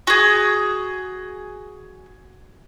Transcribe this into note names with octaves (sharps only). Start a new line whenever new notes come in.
F#4 G#4